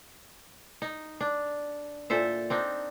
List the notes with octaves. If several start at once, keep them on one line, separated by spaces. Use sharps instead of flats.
D#4
D4
A#2 A4 C5 E5
C4 D4 D#4